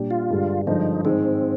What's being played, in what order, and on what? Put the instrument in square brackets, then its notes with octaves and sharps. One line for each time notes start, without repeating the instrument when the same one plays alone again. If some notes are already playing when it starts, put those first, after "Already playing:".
Already playing: [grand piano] A#2 G3 D4 G4
[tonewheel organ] F4
[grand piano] G2 D3 G#3 D4 G4
[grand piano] G2 D3 F3 G#3 [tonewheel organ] D#4
[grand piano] G#2 D#3 G#3 [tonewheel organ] C4